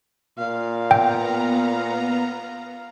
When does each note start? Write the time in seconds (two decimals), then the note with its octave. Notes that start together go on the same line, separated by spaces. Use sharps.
0.39 A#2 F5
0.91 B3 G5 A#5